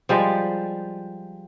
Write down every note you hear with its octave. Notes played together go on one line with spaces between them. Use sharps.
F3 G3 G#3